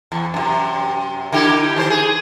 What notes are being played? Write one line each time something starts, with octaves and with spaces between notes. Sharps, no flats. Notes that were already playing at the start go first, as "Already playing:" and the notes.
E2
F#2 C3
D3 E4 G4
D#3 C5
G#4